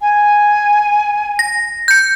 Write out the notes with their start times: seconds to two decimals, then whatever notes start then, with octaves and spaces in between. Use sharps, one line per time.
0.02 G#5
1.39 A#6
1.88 G6 C#7